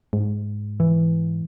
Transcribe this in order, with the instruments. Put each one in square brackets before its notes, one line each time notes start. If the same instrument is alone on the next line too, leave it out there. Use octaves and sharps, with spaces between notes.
[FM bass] G#2
[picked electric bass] E3